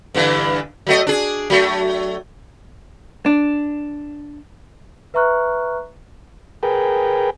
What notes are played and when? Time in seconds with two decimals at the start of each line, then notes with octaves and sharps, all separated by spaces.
0.14 G2 D3 E3
0.87 F#3 A3 D#5
1.07 D4 G#4
1.50 F#3 A3
3.26 D4
5.14 B4 E5 A#5 C#6 F6 F#6
6.63 G#4 A#4 B4 G5